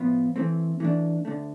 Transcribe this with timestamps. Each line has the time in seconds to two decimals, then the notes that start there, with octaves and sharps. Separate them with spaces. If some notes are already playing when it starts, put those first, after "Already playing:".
Already playing: A2 F3 B3 F4
0.36 E3 A3 C4
0.80 E3 A3 D4
1.25 D2 D3 A3